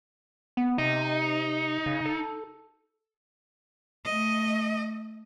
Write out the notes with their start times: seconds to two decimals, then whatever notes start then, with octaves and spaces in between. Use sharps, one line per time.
0.57 B3
0.78 C3 D#4
1.86 C#3
2.06 A4
4.05 A3 D#5